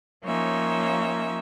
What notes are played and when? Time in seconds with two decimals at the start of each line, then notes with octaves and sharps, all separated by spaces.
0.24 F3 A#3 C#4 D#4 C#5 E5